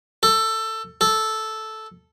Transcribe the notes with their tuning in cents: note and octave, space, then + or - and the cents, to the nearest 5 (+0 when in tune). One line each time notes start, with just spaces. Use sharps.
A4 +15
A4 -5